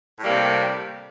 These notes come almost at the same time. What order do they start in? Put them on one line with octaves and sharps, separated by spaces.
A2 G3 A#3 C3